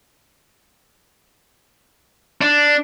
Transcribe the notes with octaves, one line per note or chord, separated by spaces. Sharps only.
D4